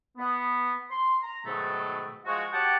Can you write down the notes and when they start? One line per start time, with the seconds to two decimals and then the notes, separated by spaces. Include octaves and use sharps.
0.18 B3
0.89 C6
1.22 A#5
1.45 G#2 B2 D#3 F#3 A3
2.25 F3 G#3 F4 F#4
2.52 F#4 G4 C#5 F#5 G5 A5